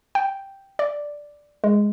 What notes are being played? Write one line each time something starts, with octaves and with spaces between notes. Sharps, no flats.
G5
D5
G#3